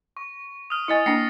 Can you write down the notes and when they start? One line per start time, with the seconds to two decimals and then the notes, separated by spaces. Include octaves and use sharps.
0.17 C#6
0.70 D#6 F6
0.88 E4 D#5 G#5 A6 C#7
1.06 A#3 D4 A#6 C7 C#7